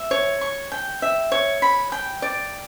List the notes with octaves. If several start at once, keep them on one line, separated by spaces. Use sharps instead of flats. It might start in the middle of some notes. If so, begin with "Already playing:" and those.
Already playing: E5
C#5
C#6
G5
E5
C#5
B5
G5
D5